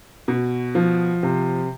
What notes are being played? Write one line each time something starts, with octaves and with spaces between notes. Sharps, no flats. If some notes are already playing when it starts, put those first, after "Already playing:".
B2
F3
C3